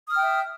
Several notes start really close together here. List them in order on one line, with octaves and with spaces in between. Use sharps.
D#6 F6 G5 E5